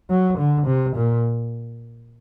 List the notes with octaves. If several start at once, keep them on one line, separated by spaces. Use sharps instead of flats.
F#3
D3
C3
A#2